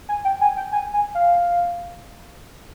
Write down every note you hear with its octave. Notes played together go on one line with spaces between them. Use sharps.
G#5
G5
G#5
G5
G#5
G#5
F5